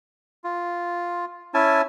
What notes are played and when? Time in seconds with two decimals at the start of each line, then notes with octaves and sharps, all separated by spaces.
0.44 F4
1.54 C#4 E4 G#5 A5